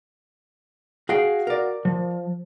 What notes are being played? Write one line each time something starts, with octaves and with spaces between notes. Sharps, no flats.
F#4 G#4 F5 G5
A#4 D5
F3